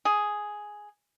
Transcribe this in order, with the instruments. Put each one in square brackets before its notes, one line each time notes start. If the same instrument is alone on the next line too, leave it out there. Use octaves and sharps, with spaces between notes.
[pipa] G#4